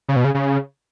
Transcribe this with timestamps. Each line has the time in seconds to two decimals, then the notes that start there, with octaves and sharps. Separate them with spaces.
0.08 C#3
0.16 B2
0.24 C#3
0.34 C#3